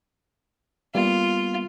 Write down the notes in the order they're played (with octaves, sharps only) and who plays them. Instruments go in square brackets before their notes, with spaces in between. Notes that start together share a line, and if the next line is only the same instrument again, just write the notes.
[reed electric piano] G3 A#3 B3 [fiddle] F4